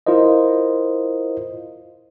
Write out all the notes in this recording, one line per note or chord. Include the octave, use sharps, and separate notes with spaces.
E4 F4 A#4 C5 D#5